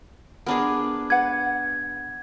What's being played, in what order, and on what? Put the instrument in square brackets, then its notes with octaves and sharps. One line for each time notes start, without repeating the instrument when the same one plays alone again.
[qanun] B3 D4 G#4 [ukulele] A#4 B5
[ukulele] B4 F#5 [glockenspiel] G#6